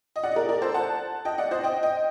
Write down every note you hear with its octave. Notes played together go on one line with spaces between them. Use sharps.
D#5
D5 F#5
D#5
A#4 D5
A#4 D5
A4 C5
F#5 A5
D#5 G5
D5 F#5
C5 D#5
D#5 G5
D#5 G5